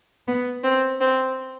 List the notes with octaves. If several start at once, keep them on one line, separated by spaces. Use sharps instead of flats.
B3
C4
C4